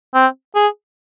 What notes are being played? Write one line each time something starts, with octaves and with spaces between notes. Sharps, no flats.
C4
G#4